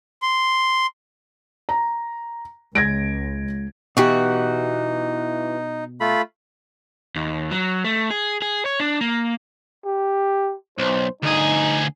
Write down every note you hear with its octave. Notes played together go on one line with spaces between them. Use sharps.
C6
A#5
C#2 G#3 G#6 A#6 D7
B2 E3 D#4 F#4 G4
A3 F4 B5
D#2
F#3
A3
G#4
G#4
C#5
D4
A#3
G4
B1 C5
D2 D#4 G#4